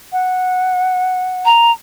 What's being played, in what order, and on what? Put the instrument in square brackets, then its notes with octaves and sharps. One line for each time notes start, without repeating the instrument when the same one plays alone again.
[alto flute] F#5
[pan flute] A#5